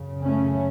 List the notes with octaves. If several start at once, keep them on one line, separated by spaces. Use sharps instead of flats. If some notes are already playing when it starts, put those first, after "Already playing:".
Already playing: F#2 C#3
A3 C#4